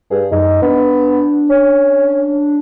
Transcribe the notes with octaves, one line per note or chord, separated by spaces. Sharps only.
G2 G#4
F#2 D#4
B3 D4
C#4